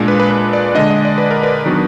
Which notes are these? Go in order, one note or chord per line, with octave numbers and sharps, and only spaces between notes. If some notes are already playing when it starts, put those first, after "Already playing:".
Already playing: A#2 G#3 D4
B4
B4
B4
D5
D3 G#3 D4 D#5
D#5
D5
B4
A#4
B4
D#3 F#3 B3 D4